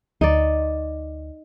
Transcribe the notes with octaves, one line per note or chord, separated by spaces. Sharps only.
D2 D#4 D5